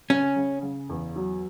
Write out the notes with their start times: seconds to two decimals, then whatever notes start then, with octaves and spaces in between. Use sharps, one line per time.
0.10 C#3 C#4
0.36 C#3
0.63 C#3
0.89 E2
1.16 F#3